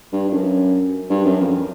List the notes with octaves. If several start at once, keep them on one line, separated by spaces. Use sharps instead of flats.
G2
G2
F#2
G2
F#2
F2